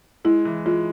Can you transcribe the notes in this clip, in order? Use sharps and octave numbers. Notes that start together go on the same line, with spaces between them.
G#3 E4
E3
G#3 F4